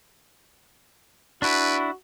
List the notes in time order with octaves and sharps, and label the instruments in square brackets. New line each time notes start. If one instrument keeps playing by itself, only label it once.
[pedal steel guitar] D4 E4 [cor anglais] F#4 [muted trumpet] B4